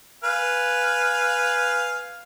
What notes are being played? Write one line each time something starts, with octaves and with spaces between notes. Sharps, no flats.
B4 F5 G#5